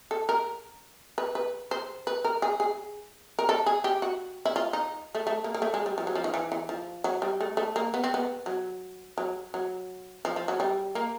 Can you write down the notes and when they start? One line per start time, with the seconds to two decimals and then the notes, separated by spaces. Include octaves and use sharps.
0.11 A4
0.29 A#4
1.18 B4
1.35 B4
1.71 C5
2.07 B4
2.24 A#4
2.42 G#4
2.60 G#4
3.39 A#4
3.49 A4
3.66 G#4
3.84 G4
4.02 F#4
4.45 E4
4.56 F4
4.73 D#4
5.15 A3
5.27 A3
5.44 A#3
5.54 A#3
5.62 A3
5.74 G#3
5.86 G3
5.98 F3
6.07 F#3
6.15 F3
6.24 D#3
6.34 E3
6.52 E3
6.69 F3
7.04 F#3
7.22 G3
7.41 A3
7.57 A3
7.76 A#3
7.94 B3
8.04 C4
8.14 B3
8.46 F#3
9.18 F#3
9.54 F#3
10.25 F3
10.36 F3
10.48 F#3
10.60 G3
10.95 A#3